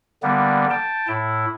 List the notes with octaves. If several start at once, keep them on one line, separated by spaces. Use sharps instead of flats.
D3 G3 A#3 B3
G5 A5
A2 E4